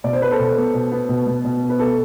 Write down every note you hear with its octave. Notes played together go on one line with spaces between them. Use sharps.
B2 D5
C5
B3 B4
A4 C5
B2
B3
B2
B3
B2
B2
B2
B3
B4
B3 A4